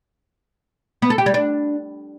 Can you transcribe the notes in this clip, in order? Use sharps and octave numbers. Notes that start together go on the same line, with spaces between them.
B3
A4
G4
G3
D4